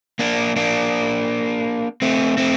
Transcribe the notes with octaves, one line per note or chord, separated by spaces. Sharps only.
A#3 D4
A#3 D4
A3 C4
A3 C4